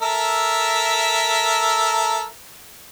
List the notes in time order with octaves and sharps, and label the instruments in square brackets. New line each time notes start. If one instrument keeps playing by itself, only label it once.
[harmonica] A4 A#4 E5